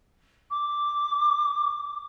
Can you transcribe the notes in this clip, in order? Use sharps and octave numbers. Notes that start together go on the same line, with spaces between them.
D6